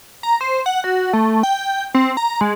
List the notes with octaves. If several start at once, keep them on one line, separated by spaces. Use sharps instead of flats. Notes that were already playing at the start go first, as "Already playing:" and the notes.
A#5
C5
F#5
F#4
A3
G5
C4
A#5
G#3